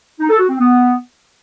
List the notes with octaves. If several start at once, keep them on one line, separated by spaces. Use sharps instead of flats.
D#4
A4
F#4
C4
B3